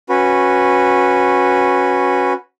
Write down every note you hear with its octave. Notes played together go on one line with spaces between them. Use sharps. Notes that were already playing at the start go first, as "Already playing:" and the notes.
C#4 F#4 B4